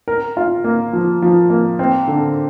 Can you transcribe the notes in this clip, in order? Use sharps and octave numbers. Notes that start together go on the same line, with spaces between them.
A#4
F4
A#3
F3
F3
A#3
C4
D3